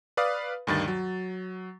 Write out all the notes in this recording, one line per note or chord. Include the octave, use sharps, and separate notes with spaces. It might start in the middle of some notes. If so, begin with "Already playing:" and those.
B4 D5 F5 D#6
D2 G2 D#3 A6
F#3